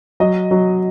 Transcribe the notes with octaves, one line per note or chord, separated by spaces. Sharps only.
F#3 D#5
F#3